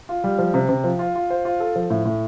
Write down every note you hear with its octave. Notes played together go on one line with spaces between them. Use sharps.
F4
G3
F3
C3
C3
F3
F4
F4
C5
F4
A4
F3
A2
A2